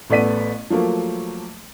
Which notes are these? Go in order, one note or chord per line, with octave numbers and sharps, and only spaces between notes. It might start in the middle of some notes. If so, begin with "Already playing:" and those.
A1 A3 B3 D5 B6 D#7
F3 F#3 A3 A#3